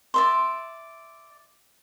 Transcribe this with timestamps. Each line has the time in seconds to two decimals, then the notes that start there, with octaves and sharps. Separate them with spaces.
0.14 D5 E5 C6